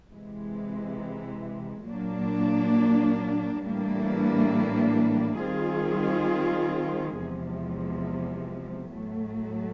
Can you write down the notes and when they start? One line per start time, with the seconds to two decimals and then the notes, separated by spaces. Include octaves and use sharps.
0.11 C3 E3 G#3
1.88 A#2 F#3 A#3 D4
3.64 A2 E3 G3 A#3 D4
5.40 D#3 G3 C4 F4 G#4
7.16 E2 C3 F3 G#3
8.92 A2 F#3 A3